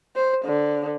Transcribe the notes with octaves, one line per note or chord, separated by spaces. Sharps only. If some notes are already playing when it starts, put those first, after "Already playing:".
C5
D3